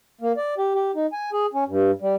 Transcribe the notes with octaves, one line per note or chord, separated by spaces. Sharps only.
A#3
D5
G4
G4
D#4
G#5
G#4
C#4
G2
G3